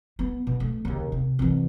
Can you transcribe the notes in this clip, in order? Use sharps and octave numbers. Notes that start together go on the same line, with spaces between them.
B3
B2
A3
D#2 C#3
C3
C2 E3